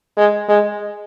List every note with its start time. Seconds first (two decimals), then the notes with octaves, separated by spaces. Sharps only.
0.17 G#3
0.49 G#3